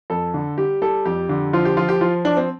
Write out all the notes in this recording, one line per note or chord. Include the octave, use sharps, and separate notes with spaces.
F2 A4
D3
G3 G4
G3 A4
F2 G4
D3
F3 F4
G4
F3 F4
G4
F3 F4
F3 D4
C4